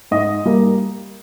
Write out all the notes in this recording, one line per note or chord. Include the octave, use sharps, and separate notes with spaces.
G#2 D#5
G3 A#3